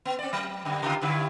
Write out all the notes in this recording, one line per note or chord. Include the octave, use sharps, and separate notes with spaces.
B3
C4 D5
F#3
F#2 D3 G3
C#3 D#4 F4
G2 D3 E4